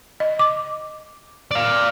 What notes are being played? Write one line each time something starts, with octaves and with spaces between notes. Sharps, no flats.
D#5
D6
D5 F5